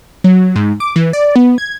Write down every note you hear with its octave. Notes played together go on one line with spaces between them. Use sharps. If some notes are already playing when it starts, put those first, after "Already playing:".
F#3
G#2
D6
E3
D5
B3
G#6